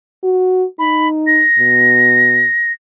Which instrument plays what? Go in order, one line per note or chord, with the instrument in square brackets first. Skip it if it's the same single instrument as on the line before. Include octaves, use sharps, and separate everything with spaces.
[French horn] F#4
[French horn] D#4 [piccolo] B5
[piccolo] A#6
[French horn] B2